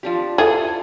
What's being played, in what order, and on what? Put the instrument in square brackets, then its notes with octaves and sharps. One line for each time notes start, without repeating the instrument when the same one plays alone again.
[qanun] F3 D4 G4
[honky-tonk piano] E4 F4 A4 [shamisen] G#4